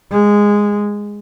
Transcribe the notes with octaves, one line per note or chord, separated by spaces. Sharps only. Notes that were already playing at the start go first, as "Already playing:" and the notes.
G#3